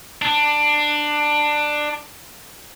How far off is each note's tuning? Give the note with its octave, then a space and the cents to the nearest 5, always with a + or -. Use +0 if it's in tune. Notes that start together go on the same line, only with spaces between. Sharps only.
D4 +15